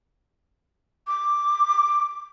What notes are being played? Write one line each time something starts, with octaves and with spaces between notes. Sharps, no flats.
D6